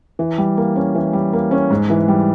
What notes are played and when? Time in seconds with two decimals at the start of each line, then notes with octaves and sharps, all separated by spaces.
0.19 E3
0.38 G3
0.57 A#3
0.76 C#4
0.95 E3
1.13 G3
1.33 A#3
1.51 C#4
1.70 G#2
1.90 E3
2.08 G3